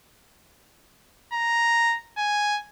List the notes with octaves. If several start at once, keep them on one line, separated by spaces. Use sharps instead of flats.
A#5
G#5